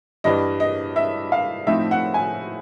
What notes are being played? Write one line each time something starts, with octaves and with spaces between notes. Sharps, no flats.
G2 E3 G3 D#5
D#5
E5
F5
A2 F3 A3 C4 D#4 E5
F#5
G#5